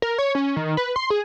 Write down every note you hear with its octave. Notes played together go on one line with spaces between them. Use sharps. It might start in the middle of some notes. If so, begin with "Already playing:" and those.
A#4
C#5
C#4
D#3
B4
C6
G#4